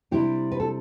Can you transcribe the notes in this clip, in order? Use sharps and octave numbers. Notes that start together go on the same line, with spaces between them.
C3 G3 D4 E4 G4
B4
A4